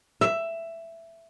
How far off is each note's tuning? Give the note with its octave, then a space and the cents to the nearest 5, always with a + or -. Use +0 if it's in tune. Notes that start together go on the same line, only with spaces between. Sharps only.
E5 +10